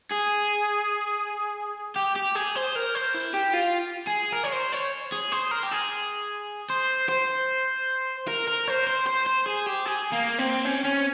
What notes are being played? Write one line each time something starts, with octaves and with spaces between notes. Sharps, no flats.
G#4
G4
G4
G#4
C5
A#4
C5
E4
G4
F4
G#4
A#4
C#5
C5
C#5
G#4
C5
A#4
G4
G#4
C5
C5
A#4
A#4
C5
C5
C5
C5
G#4
G4
G#4
A#3
C4
C#4
C#4